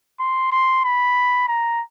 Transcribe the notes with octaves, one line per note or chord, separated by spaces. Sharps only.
C6
C6
B5
A#5